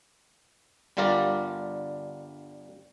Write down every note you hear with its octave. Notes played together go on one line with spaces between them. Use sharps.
G1 D3 G3 F4 A#4 D5